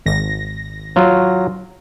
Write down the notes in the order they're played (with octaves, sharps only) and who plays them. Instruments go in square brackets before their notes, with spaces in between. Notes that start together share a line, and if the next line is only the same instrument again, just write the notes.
[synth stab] G#1 A#6
[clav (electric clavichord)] F#3 F4 F5